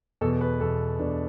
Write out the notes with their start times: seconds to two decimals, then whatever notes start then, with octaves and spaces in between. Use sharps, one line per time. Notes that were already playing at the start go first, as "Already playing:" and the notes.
0.21 E2 B2 A4
0.41 B4
0.60 E2 B2 A4
0.99 E2 B2 D4